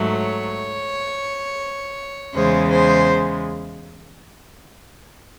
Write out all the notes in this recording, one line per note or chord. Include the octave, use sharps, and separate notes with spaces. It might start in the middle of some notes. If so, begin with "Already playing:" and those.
Already playing: G#2 F#3 A3
C#5
E2 C#3 G#3 C5
C5